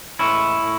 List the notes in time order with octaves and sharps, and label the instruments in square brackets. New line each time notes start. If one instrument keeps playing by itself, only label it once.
[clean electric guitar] A2 E3 G#3 C#4 E4
A2